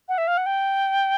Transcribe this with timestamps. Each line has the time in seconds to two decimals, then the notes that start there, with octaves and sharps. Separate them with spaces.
0.09 F#5
0.18 E5
0.28 F5
0.37 F#5
0.46 G5